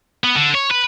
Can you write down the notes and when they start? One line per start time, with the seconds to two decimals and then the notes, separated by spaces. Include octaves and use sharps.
0.24 B3
0.37 D3
0.55 C#5
0.71 B4